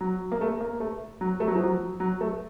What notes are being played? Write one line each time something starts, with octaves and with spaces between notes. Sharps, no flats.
F#3
A#3
A3
A#3
A3
F#3
A3
F#3
F3
F#3
F#3
A3